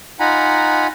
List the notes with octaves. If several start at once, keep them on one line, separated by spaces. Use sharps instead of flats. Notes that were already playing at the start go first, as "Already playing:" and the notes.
D#4 F4 F#5 G#5 A#5 B5